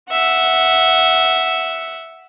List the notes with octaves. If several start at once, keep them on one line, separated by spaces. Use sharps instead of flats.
E5 F#5